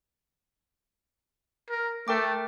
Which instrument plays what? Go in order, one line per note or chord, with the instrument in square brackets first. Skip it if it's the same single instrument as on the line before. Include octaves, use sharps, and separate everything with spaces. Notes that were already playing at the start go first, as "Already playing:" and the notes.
[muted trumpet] A#4
[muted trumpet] A3 [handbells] A#4 G5 D6